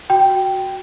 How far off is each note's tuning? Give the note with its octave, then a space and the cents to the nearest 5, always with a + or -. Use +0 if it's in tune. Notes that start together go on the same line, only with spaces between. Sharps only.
F#4 +0 G5 -10